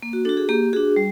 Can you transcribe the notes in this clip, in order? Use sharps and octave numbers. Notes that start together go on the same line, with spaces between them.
A#3
F#4
D4 F#4 A4
G#4
A#3 G4
D4 F#4 G#4
G3